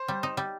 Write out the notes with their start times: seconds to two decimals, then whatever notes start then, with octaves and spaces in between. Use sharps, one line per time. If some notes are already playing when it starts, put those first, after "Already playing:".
Already playing: C5
0.08 G3
0.23 D#4
0.37 G3